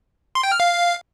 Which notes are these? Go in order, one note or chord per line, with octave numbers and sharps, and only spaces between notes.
C6
G5
F6
F5